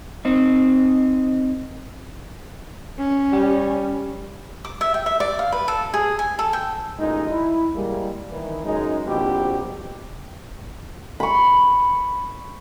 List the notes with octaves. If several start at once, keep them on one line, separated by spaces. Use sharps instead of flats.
C4 D#4
C#4
G3
D6
E5
G5
E5
D5
F5
B4
A4
G#4
G#5
A4
G5
A1 A#2 G#3 D#4
E4
G3 G#3 A#3
D#3 E3
F#2 G#3 D#4
A#1 G#2 B2 A#3 C4 G4
B5 C#6